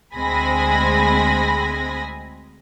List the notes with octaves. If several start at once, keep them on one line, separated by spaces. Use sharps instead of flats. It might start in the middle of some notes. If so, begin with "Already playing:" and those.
D2 G#3 C4 G#5 B5 A#6